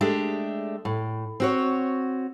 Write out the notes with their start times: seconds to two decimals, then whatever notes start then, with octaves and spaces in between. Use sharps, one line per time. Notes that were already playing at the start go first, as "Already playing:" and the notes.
0.01 G#3 A3 D4 G4
0.85 A2
1.40 C4 F#4 C#5